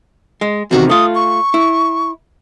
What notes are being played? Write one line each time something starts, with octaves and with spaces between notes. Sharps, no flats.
G#3
E2 C3 D#3 F#4
A3 F4 D#6
C#6
E4